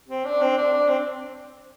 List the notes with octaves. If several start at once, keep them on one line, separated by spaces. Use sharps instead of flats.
C4
D4
C4
D4
D4
C4